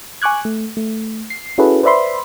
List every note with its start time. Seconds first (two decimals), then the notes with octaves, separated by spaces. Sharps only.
0.22 G#5 C#6 D6 F#6 G#6
0.45 A3
0.77 A3
1.30 C7
1.58 C#4 E4 F#4 G#4 A4 B4
1.83 B4 C5 D5 E5 B5 C6